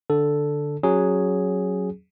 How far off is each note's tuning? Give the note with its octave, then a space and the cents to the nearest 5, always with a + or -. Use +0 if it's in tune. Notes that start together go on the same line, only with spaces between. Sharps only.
D3 +0 A4 +0
F#3 +0 C#4 +0 G#4 +0